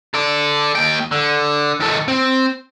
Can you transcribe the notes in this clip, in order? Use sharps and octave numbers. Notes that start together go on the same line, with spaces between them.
A4 D5
D#2 G5
D3
D#3 A4
C4